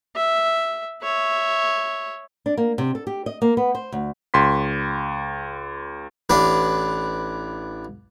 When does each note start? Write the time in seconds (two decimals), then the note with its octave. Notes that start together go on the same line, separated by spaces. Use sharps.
0.16 E5
1.03 C#5 E5
2.46 D4
2.57 A#3
2.78 C3
2.95 A4
3.07 G4
3.26 D#5
3.42 A#3
3.57 B3
3.75 C5
3.92 D2
4.34 C#2 C6 B6
6.30 A1 D4 B4